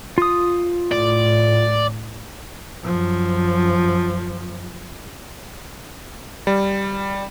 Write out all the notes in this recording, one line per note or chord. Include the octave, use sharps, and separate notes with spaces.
F4 D#6
A2 D5
F#2 F3
G3